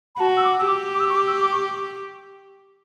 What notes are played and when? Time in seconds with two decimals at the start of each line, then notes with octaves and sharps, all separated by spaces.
0.15 B5
0.19 F#4 A5
0.37 E6
0.44 D6
0.59 E6
0.67 G4 D6
0.94 D6
1.00 E6
1.09 C#6
1.15 D6
1.27 E6
1.40 D6
1.52 C#6